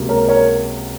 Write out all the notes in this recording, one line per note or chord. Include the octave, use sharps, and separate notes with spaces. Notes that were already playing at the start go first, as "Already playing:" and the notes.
Already playing: C#2 C3 F#3 A#3
A#4 C#5
A#4 C#5